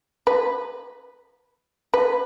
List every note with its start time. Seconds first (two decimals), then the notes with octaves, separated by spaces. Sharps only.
0.27 B4
1.94 B4